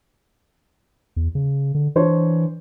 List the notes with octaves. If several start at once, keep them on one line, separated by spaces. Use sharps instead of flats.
E2
C#3
D3
E3 D4 C5 C#5